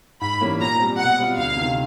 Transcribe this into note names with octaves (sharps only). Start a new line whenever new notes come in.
G#2 B5
E3 G3 A#3 C#4
A#2 A#5
G3 C4
B2 F#5
G3 C4 F4
D2 F5
C3 D#3